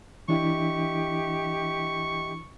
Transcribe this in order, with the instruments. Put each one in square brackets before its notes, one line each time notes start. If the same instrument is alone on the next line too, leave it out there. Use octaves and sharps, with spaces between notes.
[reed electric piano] E3 D4 E4 [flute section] G4 D#5 E5 [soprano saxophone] C#6